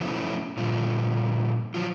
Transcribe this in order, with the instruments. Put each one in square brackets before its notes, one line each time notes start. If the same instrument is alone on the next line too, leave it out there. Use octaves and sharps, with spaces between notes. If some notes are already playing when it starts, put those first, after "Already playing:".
[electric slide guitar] F3 F#3 A3 B3 C#4 E4
A#2 D3 F3 G3
F3 F#3 F4